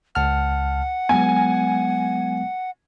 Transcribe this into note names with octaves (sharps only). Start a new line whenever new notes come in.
C#2 F#5 A5 F6
F#3 G#3 B3 G#5